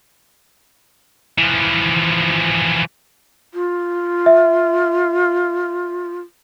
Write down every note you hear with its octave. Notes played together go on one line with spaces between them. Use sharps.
E3 F3
F4
E5